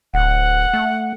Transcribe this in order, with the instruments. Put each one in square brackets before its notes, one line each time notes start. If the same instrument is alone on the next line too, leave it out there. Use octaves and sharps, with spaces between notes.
[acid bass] D1 [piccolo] F#5
[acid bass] A3